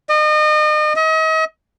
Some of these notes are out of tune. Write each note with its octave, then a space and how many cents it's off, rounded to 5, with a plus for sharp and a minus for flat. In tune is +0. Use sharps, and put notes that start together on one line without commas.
D#5 -35
D#5 +40